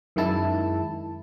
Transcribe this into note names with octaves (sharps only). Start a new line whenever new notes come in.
F#2 D#3 G#3 E4 A5